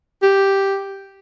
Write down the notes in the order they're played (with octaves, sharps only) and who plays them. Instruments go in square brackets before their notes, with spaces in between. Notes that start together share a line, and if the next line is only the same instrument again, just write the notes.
[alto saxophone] G4